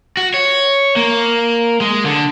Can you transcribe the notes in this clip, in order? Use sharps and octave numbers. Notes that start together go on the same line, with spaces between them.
F#4
C#5
A#3
G#3
D3